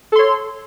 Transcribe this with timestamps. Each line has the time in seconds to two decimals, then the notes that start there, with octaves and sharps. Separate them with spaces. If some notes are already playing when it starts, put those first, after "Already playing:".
0.12 A4
0.15 C6
0.19 C#5